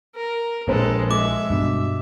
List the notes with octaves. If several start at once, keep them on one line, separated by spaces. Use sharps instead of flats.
A#4
A#1 G#3 A#3 C4 A4 B4
G#3 E5 D6
G2 B2